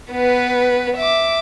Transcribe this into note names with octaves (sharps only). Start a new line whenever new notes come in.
B3 B4
E5 D6